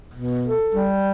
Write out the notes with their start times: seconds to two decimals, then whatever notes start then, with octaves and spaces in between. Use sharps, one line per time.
0.13 B2
0.44 A4
0.75 G3